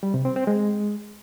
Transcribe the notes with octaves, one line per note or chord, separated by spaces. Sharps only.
G3
C3
C4
C4
G#3